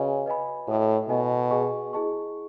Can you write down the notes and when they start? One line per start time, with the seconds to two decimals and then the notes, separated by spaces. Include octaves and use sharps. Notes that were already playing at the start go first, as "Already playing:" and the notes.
Already playing: C#3 F#4 B4 D#5 G#5
0.26 B4 D#5 G#5 B5
0.68 A2 F#4 A4 D#5
1.09 B2 F#4 A4 D#5 G#5
1.51 G#4 B4 D#5 G#5 C#6
1.93 E4 G#4 D#5 A5 C#6